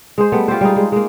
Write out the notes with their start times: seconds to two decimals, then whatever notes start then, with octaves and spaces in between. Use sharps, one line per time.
0.18 G#3 G#4 C5
0.32 G3 A3 B3
0.48 F4 G4 A4 C5
0.61 G3 G#3 D#4
0.76 G#3
0.92 G#3 A#3